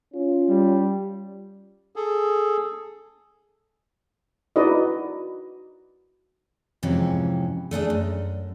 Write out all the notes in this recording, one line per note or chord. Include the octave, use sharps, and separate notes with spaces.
C#4 F4
G3
G#4 A4
D#4 E4 F#4 B4 D5 D#5
F2 G#2 C3 E3 C#4
A3 D4 E4 G#4
F#2